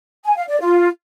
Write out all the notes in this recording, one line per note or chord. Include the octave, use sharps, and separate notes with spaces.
G#5
F5
D5
F4